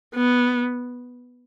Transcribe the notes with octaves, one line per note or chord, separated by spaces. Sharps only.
B3